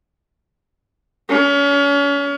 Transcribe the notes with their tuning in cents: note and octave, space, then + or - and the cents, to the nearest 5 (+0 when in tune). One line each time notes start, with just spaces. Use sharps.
C#4 +35